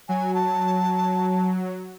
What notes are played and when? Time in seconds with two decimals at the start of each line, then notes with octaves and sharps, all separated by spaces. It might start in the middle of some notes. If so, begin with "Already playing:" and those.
0.09 F#3 G#5
0.35 A5